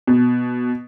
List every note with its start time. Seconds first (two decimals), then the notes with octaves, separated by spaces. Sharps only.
0.07 B2